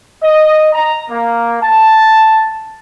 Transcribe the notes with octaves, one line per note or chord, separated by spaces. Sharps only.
D#5
A#5
A#3
A5